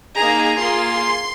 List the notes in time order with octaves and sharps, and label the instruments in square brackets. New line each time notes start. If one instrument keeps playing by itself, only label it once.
[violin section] A#3 D#4 G#4 A#5
A#3 F4 G#4 C6